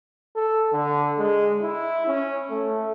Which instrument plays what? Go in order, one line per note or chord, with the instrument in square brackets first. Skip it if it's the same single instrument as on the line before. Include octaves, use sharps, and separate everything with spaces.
[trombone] A4
D3
G#3
E4
C#4
A3